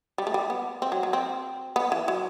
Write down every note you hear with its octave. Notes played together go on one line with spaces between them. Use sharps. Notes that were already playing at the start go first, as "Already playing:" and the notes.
G3
A3
G3
B3
C4
F#3
F#3
C4
B3
E3
F#3